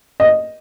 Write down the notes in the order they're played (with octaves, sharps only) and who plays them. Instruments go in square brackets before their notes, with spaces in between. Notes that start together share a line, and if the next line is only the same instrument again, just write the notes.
[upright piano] D#5